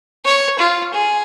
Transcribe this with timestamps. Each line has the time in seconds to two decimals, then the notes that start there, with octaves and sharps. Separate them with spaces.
0.25 C#5
0.59 F4
0.93 G#4